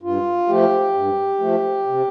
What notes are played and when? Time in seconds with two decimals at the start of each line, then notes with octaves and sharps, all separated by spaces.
0.02 G2 F4
0.48 F3 A3 G4
0.94 G2
1.39 F3 A3
1.86 C3